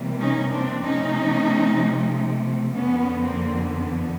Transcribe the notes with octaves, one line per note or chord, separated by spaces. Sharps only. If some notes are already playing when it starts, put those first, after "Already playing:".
Already playing: C3 E3 G3 A#3
C#4 D#4
C4 D4
C3 F3 A3 C#4 D#4
F2 D3 F3 B3 C#4
A#3 C4
B3